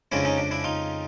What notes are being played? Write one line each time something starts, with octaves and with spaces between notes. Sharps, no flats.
F2 C#3 F3 G#3 C#4 D4 E4
C#4 D#4
D4
D4 E4
D#4 F4